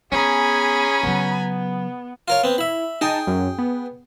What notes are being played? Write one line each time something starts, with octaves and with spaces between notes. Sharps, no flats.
B3 C#4 G#4 G#5 A#5 B5
C#3 F#3 B3
F4 A#4 C#5
B3 C4
E4 E5 B5
D#4 G#4 G5 A5 D#6
F#2
B3